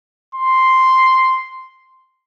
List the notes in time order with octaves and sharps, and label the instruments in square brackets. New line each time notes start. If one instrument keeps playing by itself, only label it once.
[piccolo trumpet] C6